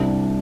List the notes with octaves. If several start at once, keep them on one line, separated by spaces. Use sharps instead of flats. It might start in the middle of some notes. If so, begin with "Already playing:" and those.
Already playing: C2 C3 G3 D4